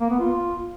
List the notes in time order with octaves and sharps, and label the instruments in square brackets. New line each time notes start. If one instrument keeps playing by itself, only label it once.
[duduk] A#3
B3
F4